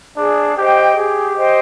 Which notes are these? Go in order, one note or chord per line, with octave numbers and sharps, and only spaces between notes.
D4 G#4
G4 C5 D#5 G5
G4 G#4
C5 D#5 G5